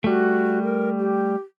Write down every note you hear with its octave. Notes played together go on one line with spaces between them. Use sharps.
G3 A3 F#4
A#4
G4